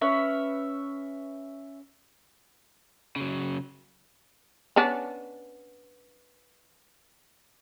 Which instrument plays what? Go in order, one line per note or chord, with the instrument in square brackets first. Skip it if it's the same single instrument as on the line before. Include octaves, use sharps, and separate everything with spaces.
[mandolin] C#4 B4 C#5 E5
[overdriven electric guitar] C#3 F#3
[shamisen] B3 C#4 D4